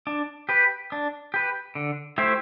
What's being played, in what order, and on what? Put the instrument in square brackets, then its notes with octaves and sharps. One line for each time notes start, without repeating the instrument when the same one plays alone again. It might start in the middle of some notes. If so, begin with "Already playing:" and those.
[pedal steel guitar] D4
G4 B4
D4
G4 B4
D3
A3 E4 G4 C5